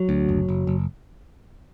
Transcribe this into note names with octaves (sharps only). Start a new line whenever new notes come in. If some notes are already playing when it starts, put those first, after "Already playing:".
Already playing: F#3
D2
F#1
F#1
F#1